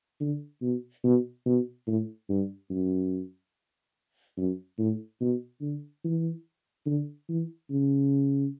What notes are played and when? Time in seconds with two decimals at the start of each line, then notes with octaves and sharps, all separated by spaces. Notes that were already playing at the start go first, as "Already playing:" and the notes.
0.20 D3
0.62 B2
1.04 B2
1.46 B2
1.87 A2
2.29 G2
2.70 F#2
4.37 F#2
4.79 A2
5.21 B2
5.62 D3
6.04 E3
6.86 D3
7.29 E3
7.70 C#3